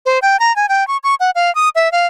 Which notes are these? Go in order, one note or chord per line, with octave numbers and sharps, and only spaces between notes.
C5
G5
A#5
G#5
G5
C#6
C#6
F#5
F5
D#6
E5
F5